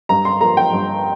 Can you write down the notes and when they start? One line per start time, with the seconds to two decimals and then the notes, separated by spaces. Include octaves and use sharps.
0.09 G2 A#5
0.25 C6
0.41 F3 A#3 A#5
0.57 G5
0.73 G2